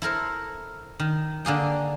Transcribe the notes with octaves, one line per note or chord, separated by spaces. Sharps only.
E4 A4 A#4 C5
D#3
D3 A#3 G#4 G5